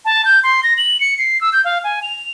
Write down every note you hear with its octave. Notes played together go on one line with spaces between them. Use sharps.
A5
G6
C6
A#6
F#7
C#7
C7
E6
G6
F5
G#5
F7